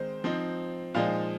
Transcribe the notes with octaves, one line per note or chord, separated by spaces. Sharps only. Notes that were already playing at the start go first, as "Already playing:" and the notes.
Already playing: D#3 G#3 C4 D#4 C5
F3 C4 D#4
A#2 F3 G#3 D#4 F5